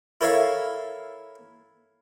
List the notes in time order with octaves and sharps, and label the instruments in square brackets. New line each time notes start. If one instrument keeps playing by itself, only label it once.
[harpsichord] E4 A4 A#4 C#5 E5 F5